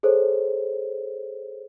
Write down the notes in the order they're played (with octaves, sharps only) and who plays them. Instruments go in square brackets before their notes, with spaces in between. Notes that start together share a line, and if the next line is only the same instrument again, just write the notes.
[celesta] G#4 A4 C5 C#5